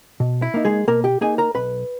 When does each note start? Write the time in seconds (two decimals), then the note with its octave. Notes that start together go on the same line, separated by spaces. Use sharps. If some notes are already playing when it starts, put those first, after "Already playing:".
0.20 B2
0.42 E4
0.54 A#3 D#4
0.65 G#3 G#4
0.88 B2 A#3 A#4
1.04 G4 G5
1.21 A#3 D#4 G#4 G#5
1.38 A#4 A#5
1.55 B1 B4 B5